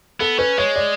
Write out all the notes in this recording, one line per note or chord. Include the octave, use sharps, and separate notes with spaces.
B3 A4
C#4 B4
G#3 C#5
D5